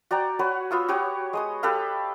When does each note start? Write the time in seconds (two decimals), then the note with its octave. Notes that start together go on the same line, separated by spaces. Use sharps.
0.11 F#4 D5 G5 A#5
0.39 F#4 B4 C#5 F#5
0.71 B3 F4 E6
0.88 F#4 G4 C#5 D#6
1.33 G#3 D#5 D#6
1.63 G4 A4 B4 F5